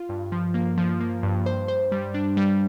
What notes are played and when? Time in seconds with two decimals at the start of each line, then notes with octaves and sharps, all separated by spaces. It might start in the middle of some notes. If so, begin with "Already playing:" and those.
Already playing: F4
0.09 G2
0.32 F3
0.54 A#3
0.77 F3
1.00 A#3
1.23 G2
1.46 C5
1.68 C5
1.92 G3
2.14 D4
2.37 G3